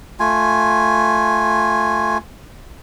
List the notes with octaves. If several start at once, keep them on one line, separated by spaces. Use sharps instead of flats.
A3 F4 G#5